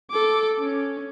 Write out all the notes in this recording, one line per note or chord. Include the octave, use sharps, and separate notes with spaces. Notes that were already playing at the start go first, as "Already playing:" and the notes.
A4 D6
C#4